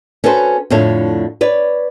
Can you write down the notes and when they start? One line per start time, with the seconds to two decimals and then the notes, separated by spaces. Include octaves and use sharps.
0.24 C#4 F#4 A4 B4 C5
0.70 F2 A2 D3 A4 C#5
1.41 B4 C#5 D5